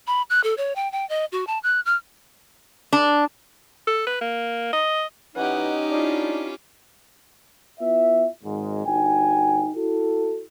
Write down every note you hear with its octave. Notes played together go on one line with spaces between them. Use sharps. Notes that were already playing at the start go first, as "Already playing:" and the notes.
B5
F#6
A4
C#5
G5
G5
D#5
F#4
A5
F#6
F6
D4
A4
B4
A#3
D#5
E3 C#4 D#4 G4 F#5
D4 E4 F4
B3 E4 F4 E5
G#1 G#2
G1 D#4 F#4 G5 G#5
E4 F#4 A4